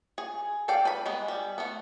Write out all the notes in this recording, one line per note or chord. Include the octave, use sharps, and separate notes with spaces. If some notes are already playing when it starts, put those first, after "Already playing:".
G#4
A4 D5 F5 G5
B4 B5
G#3 B3 B4
G3
A3 B3